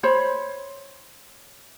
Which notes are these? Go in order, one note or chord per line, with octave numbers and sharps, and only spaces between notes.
C5 C#5 B5